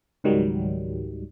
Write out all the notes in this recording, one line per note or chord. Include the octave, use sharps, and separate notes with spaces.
C#2 G#2 D#3 F#3 G3